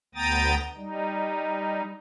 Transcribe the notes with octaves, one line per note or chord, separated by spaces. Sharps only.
D2 B3 G5 A#5 D#6 A6
G3 D#4